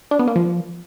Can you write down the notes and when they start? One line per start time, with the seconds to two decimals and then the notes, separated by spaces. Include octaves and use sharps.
0.11 D4
0.19 B3
0.27 A#3
0.36 F3